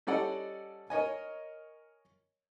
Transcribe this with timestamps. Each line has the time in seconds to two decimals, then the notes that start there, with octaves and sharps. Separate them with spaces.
0.07 G3 C#4 A4 D5 D#5 F#5
0.90 A#4 C#5 D#5 G#5